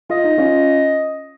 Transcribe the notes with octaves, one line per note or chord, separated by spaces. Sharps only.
F4 D#5
D#4
C#4 F4